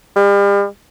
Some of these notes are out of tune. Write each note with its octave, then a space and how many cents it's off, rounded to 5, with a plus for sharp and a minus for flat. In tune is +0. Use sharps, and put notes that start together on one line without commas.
G3 +40